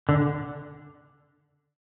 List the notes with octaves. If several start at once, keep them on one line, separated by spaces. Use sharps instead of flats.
D3